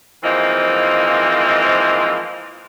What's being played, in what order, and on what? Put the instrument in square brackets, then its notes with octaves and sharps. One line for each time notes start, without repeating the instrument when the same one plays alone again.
[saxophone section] E3 F3 G#3 A#3 C4 D#4